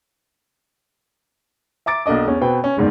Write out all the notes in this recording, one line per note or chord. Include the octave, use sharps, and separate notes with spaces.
E5 A#5 D6 A6 D7
B1 A#3 D4 D#5 D6
E2 C#4
B2 C4 B4 G5
C#4
F#1 E2 G#2 D#3 D5